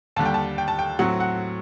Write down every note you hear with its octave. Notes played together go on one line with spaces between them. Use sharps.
D#2 D3 G3 A5
G5
A5
G5
A5
G5
A2 F#3 C4 F#5
F#5